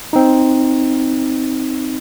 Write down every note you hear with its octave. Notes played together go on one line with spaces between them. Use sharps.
C4 D#4